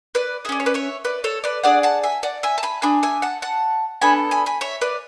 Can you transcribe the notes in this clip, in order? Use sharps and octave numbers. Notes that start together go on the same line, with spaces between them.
B4 D5
C#4 G#4 D5 E5
C#5
B4 D5
C#5 E5
B4 D5
A4 C#5
B4 D5
D4 G#4 D5 F#5
F#5 A5
E5 G#5
D5 F#5
E5 G#5
A5
G#5 B5
D4 G#4 G#5 B5
E5 G#5
F#5 A5
F#5 A5
B3 D4 A4 G#5 B5
G#5 B5
G#5 B5
C#5 E5
B4 D5